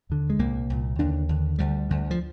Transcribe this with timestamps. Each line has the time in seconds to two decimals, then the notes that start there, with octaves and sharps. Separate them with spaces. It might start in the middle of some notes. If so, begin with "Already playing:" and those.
0.10 D#2 D3
0.30 G#3
0.39 C2 A#2 A#3
0.70 C2 A#2
0.99 D#2 D3 D4
1.29 D#2 D3
1.59 D2 D3 G3
1.89 D2 D3
2.11 F3